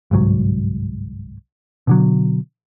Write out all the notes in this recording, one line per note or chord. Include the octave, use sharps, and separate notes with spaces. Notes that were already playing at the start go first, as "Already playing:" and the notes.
G1 C2 G#2 F#3
B2 D3 F#3